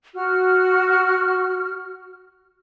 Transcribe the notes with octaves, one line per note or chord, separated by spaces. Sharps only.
F#4 F6